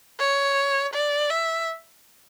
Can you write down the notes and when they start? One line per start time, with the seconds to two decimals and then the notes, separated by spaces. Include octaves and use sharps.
0.19 C#5
0.93 D5
1.30 E5